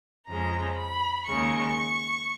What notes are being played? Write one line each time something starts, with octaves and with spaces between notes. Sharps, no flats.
F2 C#3 G#3 A#5
B5
D#2 C#3 G#3 C#6